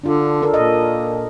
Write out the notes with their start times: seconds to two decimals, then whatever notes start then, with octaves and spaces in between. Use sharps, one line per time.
0.04 D3 D4 F4
0.42 D4 A4 A#4
0.54 A#2 D#5